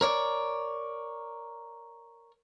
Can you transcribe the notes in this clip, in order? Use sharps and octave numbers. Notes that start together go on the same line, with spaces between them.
A#4 C#5 D5